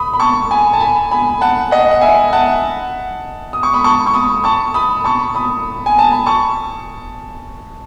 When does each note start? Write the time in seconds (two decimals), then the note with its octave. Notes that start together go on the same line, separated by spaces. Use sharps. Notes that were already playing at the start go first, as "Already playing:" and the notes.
Already playing: B5 D#6
0.13 B5
0.20 A5 C#6
0.51 G#5 B5
0.73 A5
0.80 G#5 B5
1.11 G#5 B5
1.41 F#5 A5
1.71 D#5 F#5
1.91 F#5
2.01 E5 G#5
2.33 F#5 A5
3.53 D#6
3.63 C#6
3.74 B5 D#6
3.84 A5 C#6
4.06 C#6
4.14 B5 D#6
4.44 A5 C#6
4.74 B5 D#6
5.04 A5 C#6
5.35 B5 D#6
5.86 G#5
5.99 A5
6.12 B5
6.26 A5 C#6